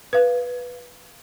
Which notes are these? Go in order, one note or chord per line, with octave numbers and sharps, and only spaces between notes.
B4 F5